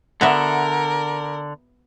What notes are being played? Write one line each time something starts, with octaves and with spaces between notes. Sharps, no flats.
D3 B3 F#4 A#4 E5